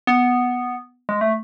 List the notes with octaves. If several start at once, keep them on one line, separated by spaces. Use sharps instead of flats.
B3
G#3
A3